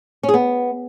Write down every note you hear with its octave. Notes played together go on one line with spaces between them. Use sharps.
C#4
G#4
B3